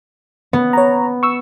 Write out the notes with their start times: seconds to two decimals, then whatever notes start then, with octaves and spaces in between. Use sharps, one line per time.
0.53 B3
0.73 C#5 A#5
1.23 C#6 E6